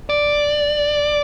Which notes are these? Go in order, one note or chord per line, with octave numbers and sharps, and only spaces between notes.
D5